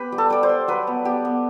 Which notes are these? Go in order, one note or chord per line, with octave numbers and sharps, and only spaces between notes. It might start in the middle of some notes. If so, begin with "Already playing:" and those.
Already playing: B3 G4 B4
G3
A4
G3 D5
C5
G3
F#3 B4
B3
B3 G4
B3